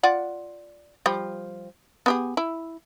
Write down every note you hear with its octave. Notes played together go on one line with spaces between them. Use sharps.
F4 D5 F#5
F3 G3
B3 G4 G#4
E4